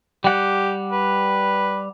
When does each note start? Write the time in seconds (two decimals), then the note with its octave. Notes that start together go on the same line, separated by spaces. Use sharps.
0.24 G3 G4 F#5
0.92 B4